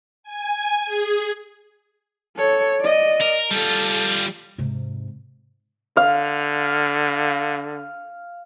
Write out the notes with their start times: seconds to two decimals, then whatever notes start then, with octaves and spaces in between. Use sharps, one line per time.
0.23 G#5
0.86 G#4
2.36 A4 C#5
2.80 D5 D#5
3.21 A#4
3.51 G3 F4 A4
4.58 G#2 C3
5.97 D3 F5